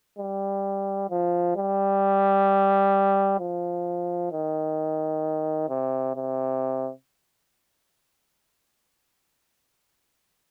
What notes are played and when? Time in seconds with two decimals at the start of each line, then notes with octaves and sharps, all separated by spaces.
0.18 G3
1.10 F3
1.56 G3
3.40 F3
4.31 D#3
5.69 C3
6.15 C3